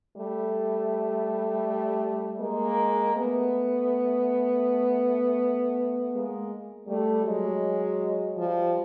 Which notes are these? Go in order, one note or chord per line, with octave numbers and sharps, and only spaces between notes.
G3 A3
G#3 A#3
A3 B3
G#3 A#3
G3 A3
F#3 G#3
F3 G3